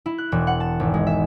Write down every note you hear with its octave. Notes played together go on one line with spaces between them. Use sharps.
E4
F#6
E1
F#5
A5
G#1
G#3
E5